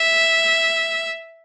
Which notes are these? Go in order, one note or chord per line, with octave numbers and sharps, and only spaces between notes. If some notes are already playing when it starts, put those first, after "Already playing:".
Already playing: E5